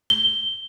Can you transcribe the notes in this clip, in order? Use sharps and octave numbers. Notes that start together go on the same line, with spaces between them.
G7